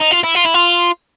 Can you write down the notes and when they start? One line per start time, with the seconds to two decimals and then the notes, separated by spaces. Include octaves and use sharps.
0.01 D#4
0.12 F4
0.24 E4
0.36 F4
0.45 E4
0.54 F4